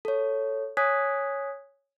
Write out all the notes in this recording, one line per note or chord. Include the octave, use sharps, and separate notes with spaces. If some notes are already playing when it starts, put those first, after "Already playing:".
A4 C#5
C#5 G#5 D#6 F#6 G#6 B6